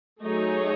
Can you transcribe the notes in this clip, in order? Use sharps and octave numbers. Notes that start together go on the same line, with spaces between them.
F#3 A3 D#4 G#4 C#5